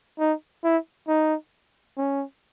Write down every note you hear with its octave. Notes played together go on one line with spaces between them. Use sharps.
D#4
E4
D#4
C#4